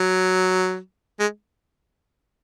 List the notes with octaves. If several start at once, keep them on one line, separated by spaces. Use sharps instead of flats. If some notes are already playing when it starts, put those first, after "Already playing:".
Already playing: F#3
G#3